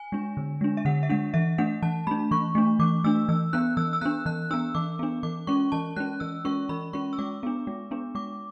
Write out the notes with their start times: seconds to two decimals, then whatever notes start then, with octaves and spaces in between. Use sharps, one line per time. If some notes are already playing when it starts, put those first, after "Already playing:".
Already playing: G#5
0.12 G#3 D4
0.37 D3
0.61 G#3 D4
0.77 E5
0.85 D3 F#5
1.03 E5
1.09 G#3 D4 F#5
1.34 E3 E5
1.58 A3 D4 F#5
1.82 E3 A5
2.07 A3 D4 B5
2.31 E3 C#6
2.55 A3 D4
2.79 E3 D6
3.04 A3 D4 E6
3.28 E3 E6
3.53 B3 D4 F#6
3.77 E3 E6
3.93 E6
4.01 B3 D4 F#6
4.26 E3 F#6
4.50 B3 D4 E6
4.75 E3 D6
4.99 B3 D4
5.23 E3 D6
5.47 G#3 C#4 C#6
5.72 E3 A5
5.96 G#3 C#4 F#6
6.20 E3 E6
6.45 G#3 C#4 C#6
6.69 E3 B5
6.93 G#3 C#4 C#6
7.13 E6
7.18 G#3 D6
7.43 B3 D4
7.67 G#3
7.91 B3 D4
8.15 G#3 D6